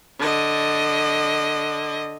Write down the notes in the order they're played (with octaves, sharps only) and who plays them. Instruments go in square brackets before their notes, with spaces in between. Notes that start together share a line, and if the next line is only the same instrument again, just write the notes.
[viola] D3 D#5